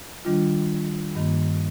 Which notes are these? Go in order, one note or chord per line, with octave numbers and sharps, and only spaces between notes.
D#3 G3 D4 F4
G2 D#3 A#3